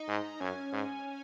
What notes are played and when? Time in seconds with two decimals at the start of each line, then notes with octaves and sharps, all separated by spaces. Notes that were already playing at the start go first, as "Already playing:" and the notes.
Already playing: D#4
0.08 G#2
0.40 F#2 C#4
0.72 G#2